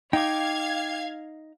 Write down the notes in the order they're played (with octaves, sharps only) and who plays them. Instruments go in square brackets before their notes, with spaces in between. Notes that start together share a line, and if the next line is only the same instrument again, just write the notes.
[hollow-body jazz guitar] D#4 [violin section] F5 G#6 [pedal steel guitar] G5 D6